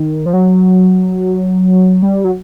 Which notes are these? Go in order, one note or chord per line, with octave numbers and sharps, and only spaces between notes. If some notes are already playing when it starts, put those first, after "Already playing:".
Already playing: D#3
F3
F#3
G3
F#3